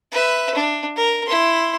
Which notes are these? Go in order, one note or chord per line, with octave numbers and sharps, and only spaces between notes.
B4 E5
D4
A#4
E4 C6